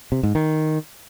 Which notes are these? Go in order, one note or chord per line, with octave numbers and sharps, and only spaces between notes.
C3
G#2
D#3